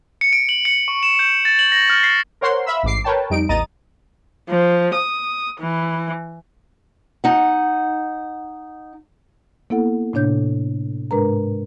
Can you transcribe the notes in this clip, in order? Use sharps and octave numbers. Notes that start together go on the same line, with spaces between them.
C#7
D7
F#7
C#7
C#6
E7
G6
A6
F#7
A#6
F6
C7
A#4 C5 C#5 F#5 C6
E5 F5 B5 E6
A1 G#2 D6 C7
A#4 B4 C#5 G5 A5
F2 G3 D#4 D7
A1 E2 D#5 A#5 A6 D#7
F3
D#6
E3
D#4 F#5
A#3 B3 E4 A4 F#5
A2 C3 D4 C#5 G6
G#2 G#3 D4 A#4 B4 A#5